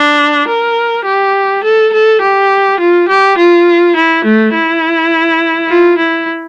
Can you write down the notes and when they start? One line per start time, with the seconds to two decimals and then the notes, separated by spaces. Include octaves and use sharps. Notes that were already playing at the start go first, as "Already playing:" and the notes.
Already playing: D4
0.48 A#4
1.06 G4
1.63 A4
1.93 A4
2.21 G4
2.79 F4
3.08 G4
3.37 F4
3.96 E4
4.24 A3
4.53 E4
5.69 F4
5.98 E4